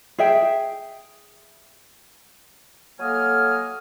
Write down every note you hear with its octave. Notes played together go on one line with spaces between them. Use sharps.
G#4 E5 G5
F#3 A#3 A4 D#5 G#5 F6